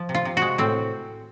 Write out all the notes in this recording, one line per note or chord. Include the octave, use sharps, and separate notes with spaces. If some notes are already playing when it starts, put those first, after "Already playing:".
Already playing: F3
C3
F4
C3
G#3 F#4
A2 C4